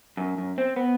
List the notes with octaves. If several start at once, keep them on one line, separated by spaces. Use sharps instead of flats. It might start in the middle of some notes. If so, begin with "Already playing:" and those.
F#2
F#2
C4
B3